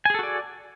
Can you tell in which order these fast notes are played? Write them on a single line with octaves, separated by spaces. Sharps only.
G#5 G#4 A4 F#4 D5